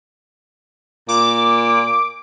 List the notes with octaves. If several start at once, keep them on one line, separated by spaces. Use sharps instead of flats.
A#2 D6